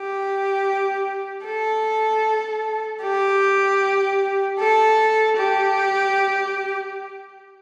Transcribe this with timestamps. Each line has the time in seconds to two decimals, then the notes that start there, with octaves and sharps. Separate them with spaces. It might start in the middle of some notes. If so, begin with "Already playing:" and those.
Already playing: G4
1.45 A4
3.02 G4
4.59 A4
5.36 G4